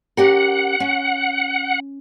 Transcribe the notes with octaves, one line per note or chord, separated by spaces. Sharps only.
C#4 G4 A#4 F#5
C#4